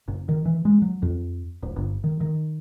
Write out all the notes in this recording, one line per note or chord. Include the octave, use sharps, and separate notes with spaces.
F#1
D#3
E3
G#3
F#3
F2
D1
G1
D#3
D#3